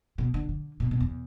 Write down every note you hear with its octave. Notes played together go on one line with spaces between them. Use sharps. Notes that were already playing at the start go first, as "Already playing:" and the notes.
B2
D3
D3
B2
B2
E2